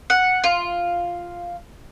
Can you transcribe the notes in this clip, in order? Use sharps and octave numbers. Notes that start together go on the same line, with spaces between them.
F#5
F4